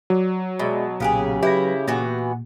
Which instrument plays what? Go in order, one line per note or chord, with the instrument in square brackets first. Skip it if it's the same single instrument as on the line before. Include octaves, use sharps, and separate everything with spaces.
[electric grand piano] F#3 [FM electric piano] D5
[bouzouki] B2 [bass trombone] G#3 [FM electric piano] D5 E5 B5
[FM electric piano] B1 A#2 F5 [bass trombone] C#3 [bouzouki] B3 G4 G#4
[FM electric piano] F#3 B4 A#6 [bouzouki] E4 [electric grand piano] G4
[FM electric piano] A#2 [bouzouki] E3 B3 F#4